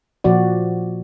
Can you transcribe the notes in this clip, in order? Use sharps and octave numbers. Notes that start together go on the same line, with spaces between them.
A#2 F3 F#4 D5